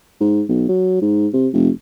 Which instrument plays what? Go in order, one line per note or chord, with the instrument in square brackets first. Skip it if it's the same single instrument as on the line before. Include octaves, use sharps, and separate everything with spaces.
[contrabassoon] G#2
B1
F#3
G#2
C3
F1